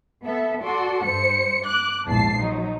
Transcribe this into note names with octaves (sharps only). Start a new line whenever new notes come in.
B3 A4 E5
F#4 A4 D5 C6
G2 C5 C#7
D6 F#6
A#1 E2 G#2 A5 C7
F3 F#3 D#4